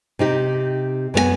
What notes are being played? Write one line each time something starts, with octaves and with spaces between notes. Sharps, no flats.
C3 D#4 G4
F#2 B3 G4 G#5